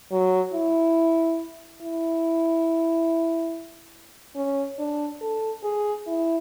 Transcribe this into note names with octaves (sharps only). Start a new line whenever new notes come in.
F#3
E4
E4
C#4
D4
A4
G#4
E4